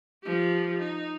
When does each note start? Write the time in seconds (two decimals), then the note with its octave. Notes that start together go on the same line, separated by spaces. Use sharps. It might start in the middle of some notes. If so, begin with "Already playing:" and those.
0.23 F3 G4
0.78 D#4